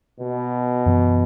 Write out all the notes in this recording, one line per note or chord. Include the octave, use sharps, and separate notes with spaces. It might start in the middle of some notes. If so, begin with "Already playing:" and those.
B2
F#2 E3 B3